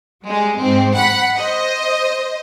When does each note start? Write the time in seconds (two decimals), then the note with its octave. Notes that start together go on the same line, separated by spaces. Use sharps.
0.25 G3 G#3
0.59 G#2 C4
0.94 F#5 B5
1.37 C5 D#5